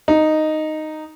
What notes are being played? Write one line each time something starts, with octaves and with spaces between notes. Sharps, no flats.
D#4